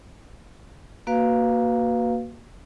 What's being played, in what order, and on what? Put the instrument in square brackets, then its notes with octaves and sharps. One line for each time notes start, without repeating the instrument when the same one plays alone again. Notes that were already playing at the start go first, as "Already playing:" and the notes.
[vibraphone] A#3 F#4 B4 F5